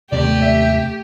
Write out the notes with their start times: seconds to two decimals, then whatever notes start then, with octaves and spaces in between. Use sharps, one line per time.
0.12 D#2 C3 A3 B3 G4 D5
0.42 E5